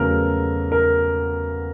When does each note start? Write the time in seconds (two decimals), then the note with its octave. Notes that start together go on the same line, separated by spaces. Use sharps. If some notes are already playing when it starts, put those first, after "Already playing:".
Already playing: E2 C#3 F#3 A3 A#4
0.72 A#4